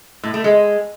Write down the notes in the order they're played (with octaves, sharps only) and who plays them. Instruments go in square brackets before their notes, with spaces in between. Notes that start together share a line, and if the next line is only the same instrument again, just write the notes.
[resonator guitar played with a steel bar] A2
A3
G#3